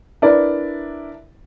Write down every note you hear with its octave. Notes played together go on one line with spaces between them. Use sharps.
D4 E4 A#4 B4 D5